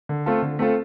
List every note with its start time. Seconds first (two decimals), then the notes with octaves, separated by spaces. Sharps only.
0.09 D3
0.26 A3 C4 F4 A4
0.42 D3
0.59 A3 C4 F4 A4